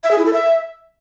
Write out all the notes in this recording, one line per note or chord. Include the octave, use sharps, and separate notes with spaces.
E5
G#4
E4
A4
E5